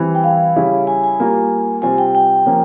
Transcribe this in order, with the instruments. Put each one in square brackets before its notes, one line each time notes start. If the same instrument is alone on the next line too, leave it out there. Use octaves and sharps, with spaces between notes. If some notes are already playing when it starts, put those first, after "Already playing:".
Already playing: [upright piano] E3 G3 C4 E4
[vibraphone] G5
F5
[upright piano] C#3 G3 C#4 E4
[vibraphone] G#5
G#5
[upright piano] G3 A#3 F4
[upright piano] C3 G3 C4 F4 [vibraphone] G#5
[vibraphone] G5
G5
[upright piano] F3 A#3 C#4